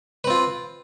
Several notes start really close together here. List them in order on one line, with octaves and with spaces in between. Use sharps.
B4 C4 F4